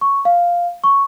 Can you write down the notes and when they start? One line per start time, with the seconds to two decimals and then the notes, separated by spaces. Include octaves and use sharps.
0.01 C#6
0.25 F5
0.84 C#6